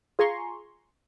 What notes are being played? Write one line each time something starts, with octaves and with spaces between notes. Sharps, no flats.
F4 G#4 G#5 A#5 C6 C#6